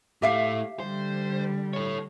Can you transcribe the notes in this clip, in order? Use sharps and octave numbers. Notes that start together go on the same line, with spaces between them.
A2 A3 G4 E5 F5
D3 G3 C5
A4 C#5